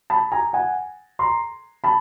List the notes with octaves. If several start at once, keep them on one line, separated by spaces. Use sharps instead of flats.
A5 B5
G#5 A#5
F#5 G#5
A#5 C6
A5 B5